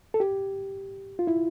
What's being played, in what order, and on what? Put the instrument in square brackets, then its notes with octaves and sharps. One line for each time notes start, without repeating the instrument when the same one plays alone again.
[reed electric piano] A4
G4
F4
E4